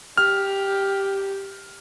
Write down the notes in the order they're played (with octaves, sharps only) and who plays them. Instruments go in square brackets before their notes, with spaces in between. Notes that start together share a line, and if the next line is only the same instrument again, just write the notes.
[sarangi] G4 [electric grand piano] F6